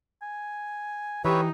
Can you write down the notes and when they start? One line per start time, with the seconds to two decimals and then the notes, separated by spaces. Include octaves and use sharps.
0.22 G#5
1.25 E3 D#4 G4 B4 C#5 E5